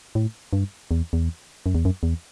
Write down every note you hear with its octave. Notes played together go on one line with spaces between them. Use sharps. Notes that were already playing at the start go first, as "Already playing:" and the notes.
A2
G2
E2
E2
F#2
E2
F#2
E2